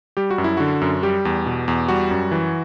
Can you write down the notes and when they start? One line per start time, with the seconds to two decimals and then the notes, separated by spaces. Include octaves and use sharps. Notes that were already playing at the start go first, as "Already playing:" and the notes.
0.17 G3 G4
0.31 F#4
0.38 F#2
0.44 E4
0.57 D3 F#4
0.81 F#2
1.03 G3 G4
1.25 E2
1.46 B2
1.68 E2
1.88 G3 F#4
2.11 F#2
2.32 E3